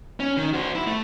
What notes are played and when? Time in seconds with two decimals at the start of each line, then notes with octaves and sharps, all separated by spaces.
0.20 C#4
0.37 D#3
0.54 F#4 C5
0.75 E4
0.87 A3